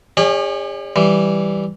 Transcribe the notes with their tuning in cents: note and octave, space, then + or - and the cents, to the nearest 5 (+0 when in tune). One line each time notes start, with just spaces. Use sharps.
C#4 +0 G#4 -45 D5 +45
E3 +0 G3 +0